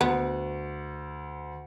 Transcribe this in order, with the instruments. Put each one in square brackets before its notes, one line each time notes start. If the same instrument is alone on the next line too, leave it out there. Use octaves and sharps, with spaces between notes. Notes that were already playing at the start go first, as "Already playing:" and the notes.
[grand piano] D2 [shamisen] B3